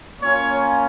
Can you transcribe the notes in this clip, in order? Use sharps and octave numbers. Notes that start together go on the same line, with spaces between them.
A#3 C#4 F4 C#5